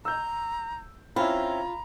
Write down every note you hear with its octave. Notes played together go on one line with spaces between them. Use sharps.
A#5 E6 G6
C4 C#4 E4 F4 A#5 B5